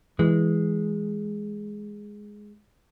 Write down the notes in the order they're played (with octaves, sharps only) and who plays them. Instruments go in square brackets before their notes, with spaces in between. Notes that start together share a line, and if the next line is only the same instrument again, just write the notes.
[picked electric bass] E3 [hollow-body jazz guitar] G#3